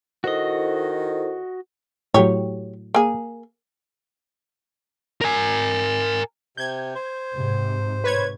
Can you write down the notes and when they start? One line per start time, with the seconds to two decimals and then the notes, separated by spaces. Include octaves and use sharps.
0.24 D#3 E4 F#4 A4 C5 D#5
2.14 A2 F#3 G4 C#5
2.95 A#3 G#4
5.21 A#4 G#5
6.57 C3 G6 G#6
6.95 C5
7.34 G#2 C3
8.04 B4 C#5 G#6